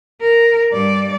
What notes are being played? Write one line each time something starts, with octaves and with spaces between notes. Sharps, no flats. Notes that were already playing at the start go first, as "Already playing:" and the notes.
A#4
G2 D5